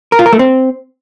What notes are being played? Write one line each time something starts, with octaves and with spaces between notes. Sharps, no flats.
A#4
F4
A#4
A3
C4